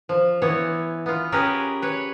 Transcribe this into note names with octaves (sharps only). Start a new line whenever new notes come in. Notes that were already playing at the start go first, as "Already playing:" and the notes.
F3
E3 B3 C#5
B3 F4
C#4 G4 G#4 A#4 B4
B4 C#5